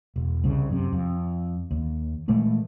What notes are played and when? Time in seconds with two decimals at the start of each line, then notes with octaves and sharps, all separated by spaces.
0.16 E1
0.44 C2 C#3
0.70 F#2 C3
0.92 F2
1.71 D#2
2.28 A#2 E3 G#3 A3